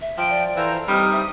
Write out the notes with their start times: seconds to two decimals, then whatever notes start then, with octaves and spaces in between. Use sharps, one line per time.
0.01 E5
0.18 F3 G5
0.30 D5
0.56 E3 A4 C5 F5 A#5
0.88 G3 C4 D#4 D#6 F6
1.12 E5